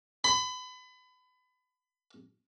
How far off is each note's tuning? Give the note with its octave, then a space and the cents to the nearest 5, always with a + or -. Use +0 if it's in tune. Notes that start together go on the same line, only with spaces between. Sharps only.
B5 +30